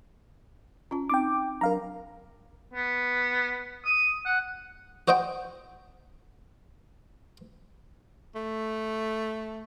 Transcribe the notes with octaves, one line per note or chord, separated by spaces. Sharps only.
C#4 F4 A5
C4 D#4 G5 D6
F#3 D4 A#4 F5 A#5
B3
D#6
F#5
F#4 C5 D#5 F#5 G5
A3